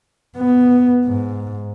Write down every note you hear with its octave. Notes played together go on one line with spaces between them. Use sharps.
B3
G#2